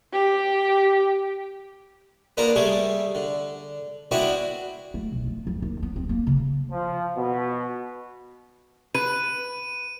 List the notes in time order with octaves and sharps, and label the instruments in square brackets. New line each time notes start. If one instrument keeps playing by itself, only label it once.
[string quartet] G4
[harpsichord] A#3 B3 D4 F4 A#4
G3 A3 G#4 A4
D3
B3 C4 D4 E4 F#4
[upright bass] A3
B1
F3
F2
D#2
B3
C4
A#3
C#3
[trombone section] F3
B2
[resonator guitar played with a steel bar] B4 [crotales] D#7